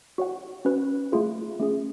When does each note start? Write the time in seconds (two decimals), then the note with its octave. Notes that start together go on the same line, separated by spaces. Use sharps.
0.18 F#4 C#5 F#5
0.65 C#4 F#4 B4
1.12 A3 F4 G#4
1.60 A3 C#4 G#4